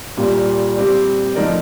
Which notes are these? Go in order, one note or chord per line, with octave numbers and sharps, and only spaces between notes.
A#2 G3 A#3 F4
G3 C4 G4 D5
F3 A3 D#4 A#4 D5